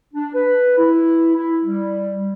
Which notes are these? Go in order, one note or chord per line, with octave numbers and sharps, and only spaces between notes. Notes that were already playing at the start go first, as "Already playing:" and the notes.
D4
B4
E4
E4
G3